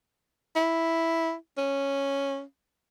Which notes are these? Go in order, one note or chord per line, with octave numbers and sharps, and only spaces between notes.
E4
C#4